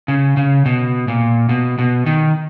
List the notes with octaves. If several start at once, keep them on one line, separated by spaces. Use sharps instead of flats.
C#3
C#3
B2
A#2
B2
B2
D#3